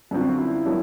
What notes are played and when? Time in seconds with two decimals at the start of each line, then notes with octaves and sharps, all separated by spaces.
0.11 F#2 D3 G3 C4 F4 F#4
0.38 E4
0.65 D#3 F#3 B3 D4